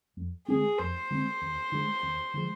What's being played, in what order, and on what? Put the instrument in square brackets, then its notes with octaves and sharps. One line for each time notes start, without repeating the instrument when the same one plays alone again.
[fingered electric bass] F2
[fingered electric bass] D3 G#3 C4 [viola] G#4
[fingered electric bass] F2 [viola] C5
[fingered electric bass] D3 G#3 C4
D#2
D3 F3 G#3
D#2
D3 F3 G#3